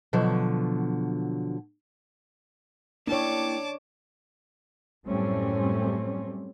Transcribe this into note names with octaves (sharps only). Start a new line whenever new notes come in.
B2 D3 F3 F#3
A#3 D4 E4 C#5 G5 A5 D6
F#2 A2 G3 A3 C4 C#4